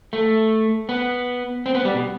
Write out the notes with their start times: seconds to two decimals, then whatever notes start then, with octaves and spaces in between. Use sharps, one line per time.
0.13 A3
0.89 B3
1.66 C4
1.75 B3
1.85 G3
1.95 B2